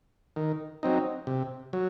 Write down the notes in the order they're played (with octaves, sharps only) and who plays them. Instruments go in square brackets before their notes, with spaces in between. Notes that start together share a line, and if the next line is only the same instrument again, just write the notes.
[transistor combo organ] D#3
F#3 C4 D#4
C3
F#3